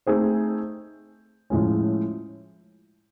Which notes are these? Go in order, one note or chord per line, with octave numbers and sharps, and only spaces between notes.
A3 C4 D#4 G#4 C5
A2 F3 G#3 C#4